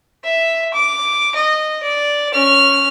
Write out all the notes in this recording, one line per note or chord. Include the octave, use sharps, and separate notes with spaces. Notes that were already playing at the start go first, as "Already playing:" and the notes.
E5
D6
D#5
D5
C#4 F6